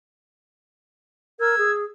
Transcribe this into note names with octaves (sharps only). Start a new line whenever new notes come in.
A#4 E6 G#6
G#4